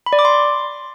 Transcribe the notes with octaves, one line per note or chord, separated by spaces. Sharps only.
B5
D5
D6
C6